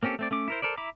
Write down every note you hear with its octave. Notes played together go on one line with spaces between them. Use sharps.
A#3 C4 C#4 G4 A4
A3 C4 D5
A3 C#4 D6
E4 A#4 C5
A4 A#4 C5 D5
E4 E5 A#5 B5 D6